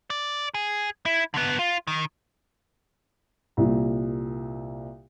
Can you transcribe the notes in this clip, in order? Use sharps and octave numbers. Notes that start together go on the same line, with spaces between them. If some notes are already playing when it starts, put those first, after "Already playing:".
D5
G#4
E4
D3 B3
F4
D#3
C2 A#2